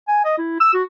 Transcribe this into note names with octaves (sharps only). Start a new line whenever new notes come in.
G#5
D#5
E4
E6
F#4